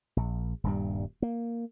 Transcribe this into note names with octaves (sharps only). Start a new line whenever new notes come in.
A#1
D#1 G2 G3
A#3